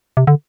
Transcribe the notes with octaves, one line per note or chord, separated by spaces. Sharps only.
C3
D3